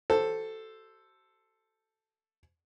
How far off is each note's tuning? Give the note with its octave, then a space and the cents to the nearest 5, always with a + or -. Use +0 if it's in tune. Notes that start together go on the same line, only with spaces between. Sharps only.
F#4 +45 A4 +0 C5 +0